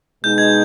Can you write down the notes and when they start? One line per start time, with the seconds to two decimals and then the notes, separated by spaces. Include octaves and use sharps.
0.24 B2 G#3 D#4 G6
0.38 G#6